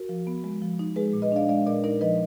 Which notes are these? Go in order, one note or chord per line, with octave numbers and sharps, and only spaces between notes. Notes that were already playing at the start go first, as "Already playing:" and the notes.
Already playing: F#4 A#4
F3
B3
G#3
F3
D#4
G#3 G#4 B4
A#2
B4 D#5
D4 D5 F5
G#3 D5 F5
A#2 A#4 D5
D#4 A#4 D5
F3 B4 D#5